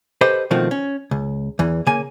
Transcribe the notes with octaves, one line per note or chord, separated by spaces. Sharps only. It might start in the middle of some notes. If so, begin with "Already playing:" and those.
G4 A4 B4 C5 D#5
B2 D#3 F3 A3 C4
C#4
C#2
E2 E3
C#3 A#3 G#5